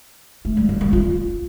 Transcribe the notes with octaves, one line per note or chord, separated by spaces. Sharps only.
A3
G3
F#3
G3
F4